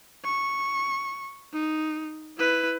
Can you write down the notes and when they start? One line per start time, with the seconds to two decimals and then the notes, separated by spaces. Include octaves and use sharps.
0.25 C#6
1.53 D#4
2.38 E4 B4